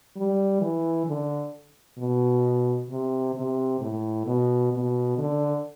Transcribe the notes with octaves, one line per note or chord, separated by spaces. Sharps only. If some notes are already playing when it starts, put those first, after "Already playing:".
G3
E3
D3
B2
C3
C3
A2
B2
B2
D3